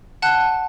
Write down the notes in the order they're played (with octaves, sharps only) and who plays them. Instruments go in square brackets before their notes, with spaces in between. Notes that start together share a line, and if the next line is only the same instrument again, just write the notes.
[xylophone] F#5 A5 F#6